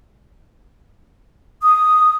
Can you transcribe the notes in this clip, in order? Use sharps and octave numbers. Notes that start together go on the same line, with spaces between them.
D#6